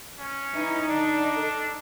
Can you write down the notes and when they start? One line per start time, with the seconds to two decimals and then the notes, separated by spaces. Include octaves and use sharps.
0.19 C#4
0.54 E3 D#4 E4 B4
0.89 D3 D4 D5
1.37 A4